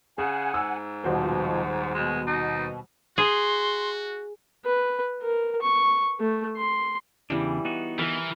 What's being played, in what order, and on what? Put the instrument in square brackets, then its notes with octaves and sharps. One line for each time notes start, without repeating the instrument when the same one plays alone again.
[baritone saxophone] C#3 [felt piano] G#4 [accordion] F#5 G#5
[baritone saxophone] G#2 [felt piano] E6
[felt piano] D#1 F#4 C5 [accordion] B2 F3
[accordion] B2 [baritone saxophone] G#3
[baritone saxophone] D#4
[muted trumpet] F#4 [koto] G#4 [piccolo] C6
[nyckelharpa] B4
A#4
C#6
A3
C6
[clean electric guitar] E2 C#3 D4 [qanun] E3 G3
[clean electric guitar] B3 D#4 F#4
[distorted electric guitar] E3 [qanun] A#4 B4